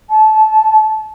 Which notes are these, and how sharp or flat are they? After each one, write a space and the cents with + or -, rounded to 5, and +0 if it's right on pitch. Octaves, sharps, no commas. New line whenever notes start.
A5 -20